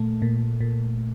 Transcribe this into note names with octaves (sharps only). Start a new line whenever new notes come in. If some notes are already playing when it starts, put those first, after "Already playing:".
Already playing: A#2 A3
A#2
A#2